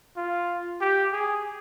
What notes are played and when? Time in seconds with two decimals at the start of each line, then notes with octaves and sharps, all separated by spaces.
0.17 F4
0.81 G4
1.13 G#4